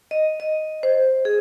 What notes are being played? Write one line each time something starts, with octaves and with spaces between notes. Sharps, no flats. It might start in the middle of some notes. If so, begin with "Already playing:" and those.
D#5
D#5
C5
G#4